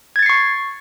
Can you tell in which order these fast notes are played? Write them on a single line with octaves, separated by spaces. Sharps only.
G#6 A6 C#7 C7 C#6